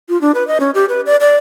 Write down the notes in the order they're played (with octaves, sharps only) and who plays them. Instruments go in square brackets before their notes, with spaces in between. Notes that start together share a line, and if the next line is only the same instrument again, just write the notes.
[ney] F4
D4
B4
D#5
C#4
G4
B4
D5
D5